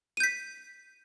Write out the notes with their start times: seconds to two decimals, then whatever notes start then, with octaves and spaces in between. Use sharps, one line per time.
0.17 D#7
0.20 G6
0.24 B6